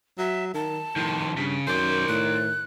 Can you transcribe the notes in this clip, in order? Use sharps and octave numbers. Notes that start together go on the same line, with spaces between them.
F#3 E5
D#3 A5
A2 D#3 F3
G2 C#3
F#2 D#3 C5 D5 G6
A2 F#6